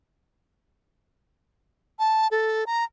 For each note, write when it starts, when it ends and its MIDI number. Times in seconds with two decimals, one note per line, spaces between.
1.99 2.28 81
2.31 2.64 69
2.67 2.84 82